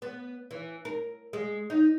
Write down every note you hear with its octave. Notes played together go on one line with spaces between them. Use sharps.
B3
E3
A#4
G#3
D#4